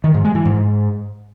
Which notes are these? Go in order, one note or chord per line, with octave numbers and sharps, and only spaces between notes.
D#3
G#2
G#3
E3
G#2